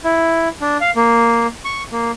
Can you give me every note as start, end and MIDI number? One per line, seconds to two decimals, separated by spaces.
0.04 0.48 64
0.61 0.77 62
0.81 0.91 77
0.96 1.47 58
1.65 1.83 85
1.92 2.11 58